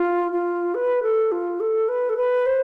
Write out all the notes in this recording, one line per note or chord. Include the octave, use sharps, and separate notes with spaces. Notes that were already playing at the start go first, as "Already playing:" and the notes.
Already playing: F4
F4
B4
A4
F4
A4
B4
A4
B4
C5